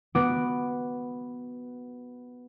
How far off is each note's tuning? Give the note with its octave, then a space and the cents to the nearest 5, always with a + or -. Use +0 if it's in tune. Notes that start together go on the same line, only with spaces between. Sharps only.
B3 +0 F#4 +0 D6 +0